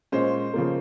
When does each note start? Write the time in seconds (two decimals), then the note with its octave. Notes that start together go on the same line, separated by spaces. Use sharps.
0.12 A#2 G#3 C#4 C5
0.54 C#3 F3 A#3